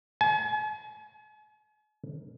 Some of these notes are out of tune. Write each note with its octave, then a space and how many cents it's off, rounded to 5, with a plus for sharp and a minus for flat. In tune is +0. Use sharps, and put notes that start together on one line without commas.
G#5 +45